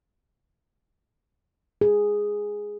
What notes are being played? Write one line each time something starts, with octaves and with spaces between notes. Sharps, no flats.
G#4